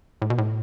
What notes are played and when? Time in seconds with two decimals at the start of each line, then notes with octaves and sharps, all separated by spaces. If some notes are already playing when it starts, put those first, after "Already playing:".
0.22 A2
0.30 B2
0.38 A2